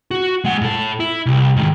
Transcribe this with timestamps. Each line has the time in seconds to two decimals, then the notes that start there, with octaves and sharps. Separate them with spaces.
0.11 F#4
0.44 G#3 F#5
0.61 A2 A4
1.00 E4
1.26 C2
1.56 G#2 D#3